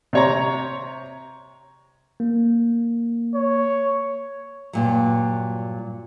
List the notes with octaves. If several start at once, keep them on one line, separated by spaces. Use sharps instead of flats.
C3 C#5 A#5
A#3
C#5
G2 A#2 F#3